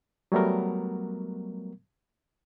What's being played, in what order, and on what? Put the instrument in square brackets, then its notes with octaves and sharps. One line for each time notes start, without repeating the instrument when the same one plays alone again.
[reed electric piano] F#3 G3 A3 B3 A#4